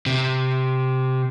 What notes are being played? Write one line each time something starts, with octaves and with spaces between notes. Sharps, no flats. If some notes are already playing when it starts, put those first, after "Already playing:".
C3